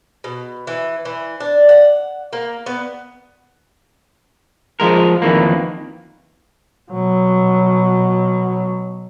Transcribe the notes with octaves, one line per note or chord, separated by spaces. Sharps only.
B2
E3
E3
D4
F#5
A#3
B3
F3 F#3 G#3 A#4
F2 D#3 E3 A#3
B2 F#3